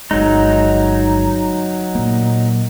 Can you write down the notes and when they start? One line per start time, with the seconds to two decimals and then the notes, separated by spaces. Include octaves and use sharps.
0.11 G1 F#3 G#3 D#4
1.95 A#2 A#3